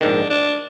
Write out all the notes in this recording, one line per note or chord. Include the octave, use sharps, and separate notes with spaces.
A#1 G#2 D#3 D4
D4